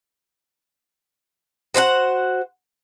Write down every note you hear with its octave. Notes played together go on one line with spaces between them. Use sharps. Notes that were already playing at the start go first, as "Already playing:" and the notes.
F#4 C5 D#5 F#5